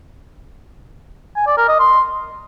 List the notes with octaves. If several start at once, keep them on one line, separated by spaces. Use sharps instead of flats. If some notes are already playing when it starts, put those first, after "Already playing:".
G#5
D5
A#4
D#5
C6